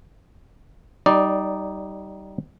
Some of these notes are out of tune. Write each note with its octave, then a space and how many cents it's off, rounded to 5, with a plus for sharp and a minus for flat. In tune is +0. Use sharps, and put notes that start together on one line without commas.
G3 -20 D#4 +0 D5 +5